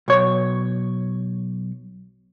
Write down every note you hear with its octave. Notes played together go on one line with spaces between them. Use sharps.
B1 C#5